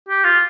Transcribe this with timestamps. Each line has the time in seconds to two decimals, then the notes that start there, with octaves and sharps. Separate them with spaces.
0.09 G4
0.24 F4